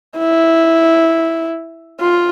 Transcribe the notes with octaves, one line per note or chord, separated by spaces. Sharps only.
E4
F4